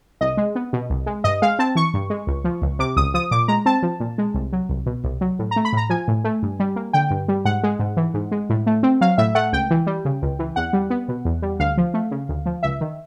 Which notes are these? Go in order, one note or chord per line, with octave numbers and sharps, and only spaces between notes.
C2 D#5
G#3
B3
B2
C2
G#3
G2 D#5
G#3 F5
C4 A5
E3 C#6
G2
G#3
C#2
F3
C#2
C3 D6
C#2 D#6
F3 D#6
A#2 D6
G#3 A#5
C4 A5
F3
A#2
G#3
C2
F#3
C2
B2
C2
F#3
A2
A#5
A3
B5
A2 A#5
F3 G#5
A2
A3
G2
G3
A#3
D3 G5
G2
G3
G#2 F#5
G#3
G#2
E3
G#2
G#3
A2
A3
C4
F#3 F5
A2 E5
A3 F#5
C#2 G5
E3
G3
C#3
C#2
E3
E2 F#5
G3
B3
B2
E2
G3
D2 F5
F3
A3
C#3
D2
F3
C#2 E5
D#3